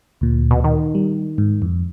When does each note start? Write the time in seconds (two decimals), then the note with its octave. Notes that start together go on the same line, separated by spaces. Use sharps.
0.21 D2 A#2
0.51 B2
0.64 D#3
0.95 G3
1.38 G#2
1.62 F2